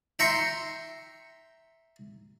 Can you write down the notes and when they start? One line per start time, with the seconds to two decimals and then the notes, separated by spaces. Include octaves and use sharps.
0.19 E5 G5 A#5 C6 C#6